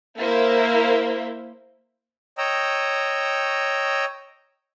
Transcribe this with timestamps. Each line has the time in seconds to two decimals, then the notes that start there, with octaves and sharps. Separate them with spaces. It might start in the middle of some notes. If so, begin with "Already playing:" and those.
0.19 A#3 E4 C5 E5
2.38 C#5 D#5 G5 A#5 E6